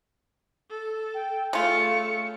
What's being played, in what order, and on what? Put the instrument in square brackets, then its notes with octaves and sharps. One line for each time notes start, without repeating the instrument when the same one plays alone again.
[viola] A4
[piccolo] G5
[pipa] C#3 F4 [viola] A3 [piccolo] C#7